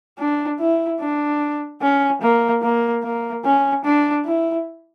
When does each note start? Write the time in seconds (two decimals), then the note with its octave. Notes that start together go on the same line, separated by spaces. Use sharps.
0.19 D4
0.59 E4
1.00 D4
1.81 C#4
2.22 A#3
2.62 A#3
3.03 A#3
3.44 C#4
3.85 D4
4.25 E4